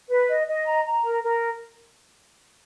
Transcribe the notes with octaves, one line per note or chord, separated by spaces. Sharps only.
B4
D#5
D#5
A#5
A#5
A#4
A#4